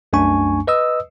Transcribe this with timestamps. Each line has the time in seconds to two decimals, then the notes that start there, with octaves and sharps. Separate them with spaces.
0.13 C2 F#2 A3 D4 G#5 C#6
0.67 B4 D#5 D#6 E6